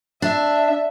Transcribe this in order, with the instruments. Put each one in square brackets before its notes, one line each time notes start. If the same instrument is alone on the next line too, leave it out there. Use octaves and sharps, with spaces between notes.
[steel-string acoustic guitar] D4 [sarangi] E5